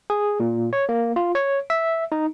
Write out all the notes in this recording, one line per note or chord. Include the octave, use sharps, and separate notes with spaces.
G#4
A#2
C#5
A#3
F4
C#5
E5
D#4